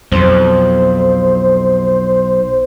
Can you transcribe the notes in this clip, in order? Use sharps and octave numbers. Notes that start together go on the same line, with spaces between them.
B1 F2 C5